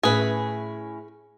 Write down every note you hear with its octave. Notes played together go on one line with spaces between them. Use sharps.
A2 C#4 G#4 B4 E5